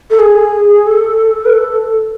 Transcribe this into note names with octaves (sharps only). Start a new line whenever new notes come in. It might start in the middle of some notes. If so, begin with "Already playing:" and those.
A4
G#4
A4
B4
A4